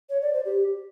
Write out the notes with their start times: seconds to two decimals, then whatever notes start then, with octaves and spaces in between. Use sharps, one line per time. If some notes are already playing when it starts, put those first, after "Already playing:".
0.10 C#5
0.22 D5
0.34 C5
0.45 G4